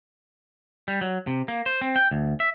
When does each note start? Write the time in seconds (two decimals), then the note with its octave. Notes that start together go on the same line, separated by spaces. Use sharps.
0.88 G3
1.01 F#3
1.27 C3
1.48 A#3
1.66 C5
1.81 C4
1.96 G5
2.11 D2
2.40 E5